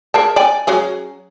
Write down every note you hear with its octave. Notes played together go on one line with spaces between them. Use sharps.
G#4 A#4 A5
D5 G5 G#5
F#3 C#4 G#4